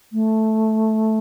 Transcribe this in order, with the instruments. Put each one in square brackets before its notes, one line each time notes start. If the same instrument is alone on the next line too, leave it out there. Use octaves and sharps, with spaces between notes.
[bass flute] A3